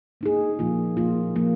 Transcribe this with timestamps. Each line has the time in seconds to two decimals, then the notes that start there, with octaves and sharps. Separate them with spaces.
0.21 A#3 D#4 G#4
0.59 A#2 F3 A#3 F4
0.97 A#2 F3 A#3 F4
1.35 A#2 F3 A#3 F4